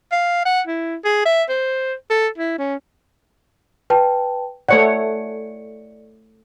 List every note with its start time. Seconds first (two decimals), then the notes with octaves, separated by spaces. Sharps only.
0.12 F5
0.45 F#5
0.67 E4
1.05 G#4
1.25 E5
1.49 C5
2.10 A4
2.38 E4
2.58 C#4
3.90 B4 G5 A5
4.69 A3 C#5 D5 F#5 C#7